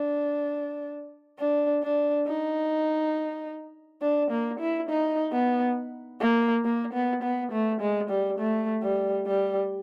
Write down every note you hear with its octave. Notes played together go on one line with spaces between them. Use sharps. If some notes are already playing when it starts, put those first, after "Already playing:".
Already playing: D4
D4
D4
D#4
D4
A#3
E4
D#4
B3
A#3
A#3
B3
B3
A3
G#3
G3
A3
G3
G3